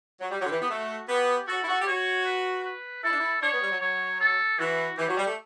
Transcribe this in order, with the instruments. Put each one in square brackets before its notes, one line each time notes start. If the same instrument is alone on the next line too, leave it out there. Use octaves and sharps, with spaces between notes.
[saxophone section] F#3
[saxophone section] G3 [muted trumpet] G4
[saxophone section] F#3
D3
E3
B3
[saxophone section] A3 [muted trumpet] F#4
[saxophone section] B3 [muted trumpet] G4
[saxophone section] F#4 [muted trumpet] A4
[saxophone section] E4
F#4
G4
[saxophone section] F#4 [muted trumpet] C#5
[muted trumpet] B4
B4
[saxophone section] E4 [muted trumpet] A4
[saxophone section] D4
E4
[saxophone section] D4 [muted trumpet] C#5
[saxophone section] B3
G3
F#3
[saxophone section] F#3 [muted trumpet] C#5
[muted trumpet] A4
[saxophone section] E3 [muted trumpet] F#4
[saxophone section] E3 [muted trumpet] G4
[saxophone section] F#3
G3
A3